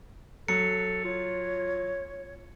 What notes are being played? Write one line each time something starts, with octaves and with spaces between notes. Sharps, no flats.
F#3 A4 C#7
F4 C#5